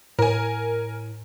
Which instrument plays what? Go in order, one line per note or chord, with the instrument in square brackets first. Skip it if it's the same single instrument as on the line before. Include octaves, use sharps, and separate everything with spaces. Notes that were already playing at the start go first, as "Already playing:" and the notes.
[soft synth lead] A2 [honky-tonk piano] A#4 G#5